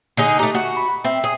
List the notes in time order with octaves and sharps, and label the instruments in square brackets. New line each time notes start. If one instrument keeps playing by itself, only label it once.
[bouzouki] D3 D#4 G#4
[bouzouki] A3 D#4 [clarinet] G4
[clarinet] A3 [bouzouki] F#4
[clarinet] B5
[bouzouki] C4 [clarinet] E5
[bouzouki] G#4